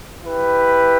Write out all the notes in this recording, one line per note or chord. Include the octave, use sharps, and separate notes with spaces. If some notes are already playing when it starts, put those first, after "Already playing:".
E4 G4 B4